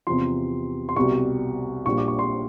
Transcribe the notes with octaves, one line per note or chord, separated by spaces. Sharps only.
E2 C3 F3 C6
C6
C2 B2 G3 C#6
A#1 A#2 G3 C#6
D6
C#6
C6